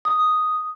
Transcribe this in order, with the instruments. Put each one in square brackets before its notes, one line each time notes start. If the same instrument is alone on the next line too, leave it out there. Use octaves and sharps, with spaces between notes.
[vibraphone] D#6